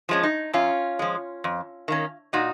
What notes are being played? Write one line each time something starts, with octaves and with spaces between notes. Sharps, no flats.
F3 G#3 C#4
D#4
F#2 C#4 F4
F3 G#3
F2
D#3 A#3 C#4
A#2 D#4 F#4